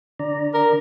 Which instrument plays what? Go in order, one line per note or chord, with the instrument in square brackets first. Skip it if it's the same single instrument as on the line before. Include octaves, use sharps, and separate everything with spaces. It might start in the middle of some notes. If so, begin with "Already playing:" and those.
[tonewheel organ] D3 D5 A#5
[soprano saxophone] A#4